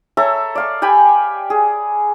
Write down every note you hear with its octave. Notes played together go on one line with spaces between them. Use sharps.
A4 C#5 E5 A#5
D5 F5 C#6
G4 G5 G#5 B5
G#4